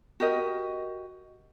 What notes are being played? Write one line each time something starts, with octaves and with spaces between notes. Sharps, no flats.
F#4 G4 A#4 D#5